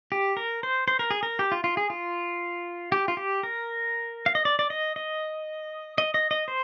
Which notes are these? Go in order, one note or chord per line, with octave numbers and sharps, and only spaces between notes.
G4
A#4
C5
C5
A#4
G#4
A#4
G4
F4
F4
G#4
F4
G4
F4
G4
A#4
F5
D#5
D5
D5
D#5
D#5
D#5
D#5
D#5
C5